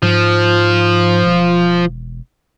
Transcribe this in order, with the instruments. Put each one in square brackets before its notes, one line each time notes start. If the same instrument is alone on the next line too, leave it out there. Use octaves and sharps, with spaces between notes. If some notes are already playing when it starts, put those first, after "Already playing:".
[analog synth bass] G#2 [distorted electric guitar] F3
[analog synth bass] E1